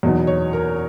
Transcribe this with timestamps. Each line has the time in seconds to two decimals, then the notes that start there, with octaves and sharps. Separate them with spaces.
0.03 E2 B2 F#3 B3 D#4
0.27 C#5
0.53 A#4